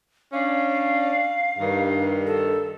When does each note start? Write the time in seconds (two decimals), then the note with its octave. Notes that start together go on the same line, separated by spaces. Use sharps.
0.33 C#4 D4 F5
1.59 G2 D#3
2.27 A4